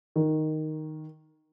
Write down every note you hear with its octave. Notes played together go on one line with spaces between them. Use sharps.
D#3